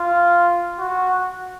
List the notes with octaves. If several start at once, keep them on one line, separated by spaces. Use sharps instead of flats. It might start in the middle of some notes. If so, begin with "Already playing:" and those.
Already playing: F4
F#4